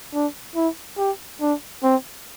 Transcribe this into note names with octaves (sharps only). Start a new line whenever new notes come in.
D4
E4
G4
D4
C4